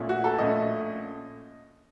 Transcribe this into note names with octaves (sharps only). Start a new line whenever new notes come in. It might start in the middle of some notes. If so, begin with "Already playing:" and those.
Already playing: A#1 A#2 A3 C#4
F#4
A4
A#1 A#2 A3 C#4 D#5